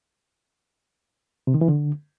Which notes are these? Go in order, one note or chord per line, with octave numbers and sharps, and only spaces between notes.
C3
D#3
E3
D3